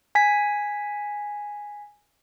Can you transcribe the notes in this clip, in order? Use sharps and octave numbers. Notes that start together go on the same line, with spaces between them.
G#5 B6